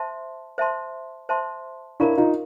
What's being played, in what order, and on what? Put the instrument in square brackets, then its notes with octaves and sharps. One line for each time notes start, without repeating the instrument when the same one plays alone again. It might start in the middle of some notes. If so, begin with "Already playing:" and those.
Already playing: [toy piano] C5 E5 A5 C6
C5 E5 A5 C6
C5 E5 A5 C6
[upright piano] D4 E4 [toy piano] A#4 C#5 F5 A#5 C#6
[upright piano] D#4 F4